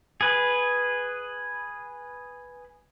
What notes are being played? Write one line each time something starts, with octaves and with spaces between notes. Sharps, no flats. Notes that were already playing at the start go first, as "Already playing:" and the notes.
G#4 B4